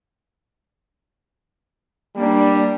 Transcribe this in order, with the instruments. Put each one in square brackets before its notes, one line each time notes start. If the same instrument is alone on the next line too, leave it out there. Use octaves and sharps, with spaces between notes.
[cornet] G3 [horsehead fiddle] A#3 D4